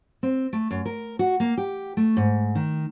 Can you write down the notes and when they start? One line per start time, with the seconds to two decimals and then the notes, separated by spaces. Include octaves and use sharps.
0.23 C4
0.53 A3
0.71 F#2
0.85 A#4
1.19 F#4
1.40 A#3
1.57 G4
1.97 A3
2.17 G#2
2.55 D#3